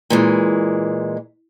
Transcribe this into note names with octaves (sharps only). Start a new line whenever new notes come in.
A#2 E3 G#3